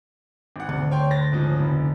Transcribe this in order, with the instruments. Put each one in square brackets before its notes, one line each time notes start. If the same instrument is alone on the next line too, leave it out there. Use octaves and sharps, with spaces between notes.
[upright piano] G#1 F#5
[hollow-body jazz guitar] D2
[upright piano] C#5 G5 C6
A6 A#6
G#2 C#3 F3
F1